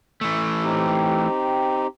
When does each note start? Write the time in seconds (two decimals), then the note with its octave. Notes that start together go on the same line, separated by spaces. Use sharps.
0.21 E3 A3
0.63 C4 D#4 G4